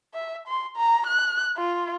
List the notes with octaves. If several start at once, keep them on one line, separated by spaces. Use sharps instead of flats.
E5
C6
A#5
F#6
F4